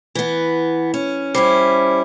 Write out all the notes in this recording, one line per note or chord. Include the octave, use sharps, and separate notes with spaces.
E3 B3
C#4
G3 C#4 E4 C5 B5 D6